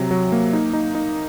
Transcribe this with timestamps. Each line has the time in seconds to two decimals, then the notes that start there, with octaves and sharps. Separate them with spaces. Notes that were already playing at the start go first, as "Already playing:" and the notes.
Already playing: C3 F#3 A#5
0.11 F#3
0.32 A#3
0.53 D#4
0.73 D#4
0.95 D#4